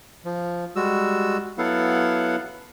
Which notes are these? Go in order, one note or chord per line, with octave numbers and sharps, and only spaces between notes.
F3
G3 G#3 F#4 E6
F#3 B3 E4 A4 F5 F#5